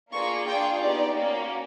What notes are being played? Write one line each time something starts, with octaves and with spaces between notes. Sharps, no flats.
A#3 D4 F4 G#4 C#6
D4 F4 G#4 G5
B3 D#4 G4 D5
A#3 C#4 F#4